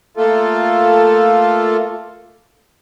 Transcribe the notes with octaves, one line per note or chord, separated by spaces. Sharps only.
A3 A#3 F4 A4